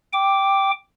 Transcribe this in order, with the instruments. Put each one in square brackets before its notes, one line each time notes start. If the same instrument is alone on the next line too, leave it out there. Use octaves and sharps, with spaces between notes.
[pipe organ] G5 D6